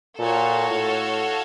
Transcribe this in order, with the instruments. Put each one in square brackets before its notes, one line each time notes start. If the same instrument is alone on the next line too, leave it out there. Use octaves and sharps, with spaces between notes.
[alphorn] A#2 [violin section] F#4 A4 C#5 F5 A5
[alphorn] A2